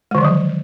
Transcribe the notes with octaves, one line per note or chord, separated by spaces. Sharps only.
D3 D#3 F3 F#3 G#3